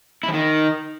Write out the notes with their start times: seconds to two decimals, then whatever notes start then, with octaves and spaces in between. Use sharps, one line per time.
0.23 E4
0.28 F3
0.34 D#3